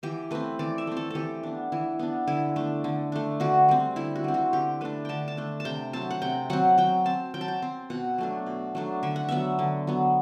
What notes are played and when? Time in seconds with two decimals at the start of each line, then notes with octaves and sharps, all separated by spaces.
0.03 E3 G4
0.31 A3 C4 B4
0.59 E3 D5
0.78 E5
0.87 A3 C4
0.97 A4
1.10 E3 G4 A4
1.43 B3 D4
1.72 E3 E4
1.99 B3 D4
2.27 D3 E4
2.56 A3 D4
2.84 D3
3.12 A3 D4
3.40 D3 F#4
3.68 G3 C4
3.96 D3 E4
4.16 F#4
4.24 G3 C4
4.34 F#4
4.53 D3 G4
4.81 A3 D4 B4
5.05 D3 G5 A5
5.28 A5
5.37 A3 D4
5.60 A5
5.65 C3 G5
5.93 F#3 C4 A5
6.11 F#5
6.22 C3 G5
6.50 F#3 C4 F#5
6.78 F#3 G5
7.06 C4 A5
7.34 F#3 G5
7.41 A5
7.48 G5
7.62 C4
7.90 B2 F#5
8.18 F#3 A3 D4
8.46 B2
8.75 F#3 A3 D4
9.03 D3 E5
9.16 F#5
9.29 F#3 B3 E5
9.59 D3
9.87 F#3 B3